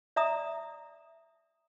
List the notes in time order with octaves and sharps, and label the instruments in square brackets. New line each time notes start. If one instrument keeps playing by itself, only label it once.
[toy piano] D5 E5 A#5 D#6